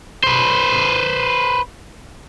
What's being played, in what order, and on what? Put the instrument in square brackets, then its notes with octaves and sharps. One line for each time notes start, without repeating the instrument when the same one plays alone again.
[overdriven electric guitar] B4 C5